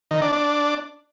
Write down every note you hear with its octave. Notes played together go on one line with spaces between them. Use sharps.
D#3
D4
D4